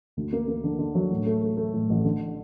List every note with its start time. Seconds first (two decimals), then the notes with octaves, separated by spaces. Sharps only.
0.17 D2
0.33 A#3
0.48 A#3
0.64 D3
0.79 D3
0.95 F#3
1.11 A2
1.26 A3
1.42 A3
1.57 A3
1.74 A2
1.89 A1
2.04 D3